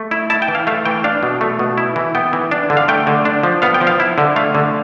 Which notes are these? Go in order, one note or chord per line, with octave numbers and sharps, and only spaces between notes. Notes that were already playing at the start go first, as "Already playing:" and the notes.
Already playing: A3
E4
E4 A5
G5
E3
F5
A3 F5
E3 G5
D4 F5
B2
A3
B2
E4
E3
B3 G5
E3
D4
D3
F5
A3 G5
D3
D4
F3
B3 F5
G5
F3
F5
E4
D3
A3 F5
D3